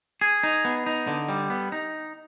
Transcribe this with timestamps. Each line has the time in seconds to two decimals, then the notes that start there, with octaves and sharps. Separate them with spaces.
0.21 G#4
0.43 D#4
0.65 B3
0.86 D#4
1.07 D3
1.29 G3
1.50 B3
1.72 D#4